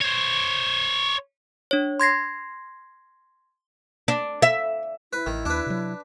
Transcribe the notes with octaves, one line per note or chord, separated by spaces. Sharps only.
C5 C#5
D4 C#5
C6 G#6 A#6 C7
D4
E5
E4 B4
A1 D#3
D#2 D4 B4
C3 F#3